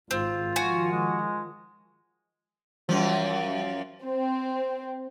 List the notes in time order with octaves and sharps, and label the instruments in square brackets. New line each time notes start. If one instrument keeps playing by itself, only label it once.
[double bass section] G#1 [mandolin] C4 [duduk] F4
[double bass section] D#3 F3 [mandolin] F#4 G#5
[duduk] G#3
[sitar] F#2 F3 [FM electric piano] E3 G3
[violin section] C4